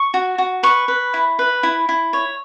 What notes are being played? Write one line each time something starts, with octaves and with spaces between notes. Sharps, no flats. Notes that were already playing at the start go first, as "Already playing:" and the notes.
Already playing: C#6
F#4
F#4
B4 C#6
B4
E4
B4
E4
E4
C#5